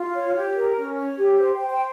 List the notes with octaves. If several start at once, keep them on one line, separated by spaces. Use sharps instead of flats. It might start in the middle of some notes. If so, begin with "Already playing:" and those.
Already playing: F4
C#5
G4
A#4
C#4
C#5
G4
C5
G5
C5
G5